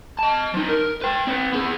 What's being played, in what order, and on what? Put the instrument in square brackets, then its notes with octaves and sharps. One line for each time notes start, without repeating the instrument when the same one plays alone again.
[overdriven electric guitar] D#5 A5
F3 D#4
A#4
B4 G5
C4 B4
B3 G#4